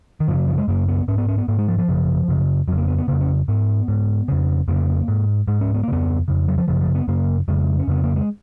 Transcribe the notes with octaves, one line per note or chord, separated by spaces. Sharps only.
D#3
F#2 C#3 F3
F#3
F3
G#3
F#2 C#3 A#3
B3
G#2 C#4
B3
C#4
B3
G#2 A#3
G#3
F3
F3
F#2 C#3
F#2 C#3
F2 C#3 F#3
A#3
B3
B3
F2 C#3 A#3
C#4
G#2 B3
G#2
F2 C#3
F2 C#3 A#3
G#2
G#2 G#3
C#4
B3
A#3
F2 C#3 B3
F2 C#3
F#3
F3
F#2 C#3 F3
F3
B3
F#2 C#3 A#3
F2 C#3 G#3
C#4
F2 C#3 B3
A#3
G#3